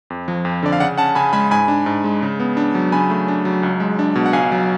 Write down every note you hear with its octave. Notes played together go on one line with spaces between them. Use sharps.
F2
F3
F2
D3 D5
F5
C#3 D5 F#5
C#4 F#5 A5
C#3 G#5 B5
G#3 G#5 B5
G#2 G#5 B5
D4
G#2
G#3
C#3
B3
D4
F#3
C#3 G#5 B5
A3
D4
F#3
C#2
G#3
D4
B2
F#5
C#2 F5 G#5
F#3